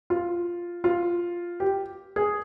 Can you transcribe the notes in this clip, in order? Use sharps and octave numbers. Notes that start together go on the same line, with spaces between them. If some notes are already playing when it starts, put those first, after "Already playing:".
F4
F4
G4
G#4